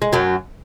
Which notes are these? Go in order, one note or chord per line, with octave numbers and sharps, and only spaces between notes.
G#3
F#2 F#3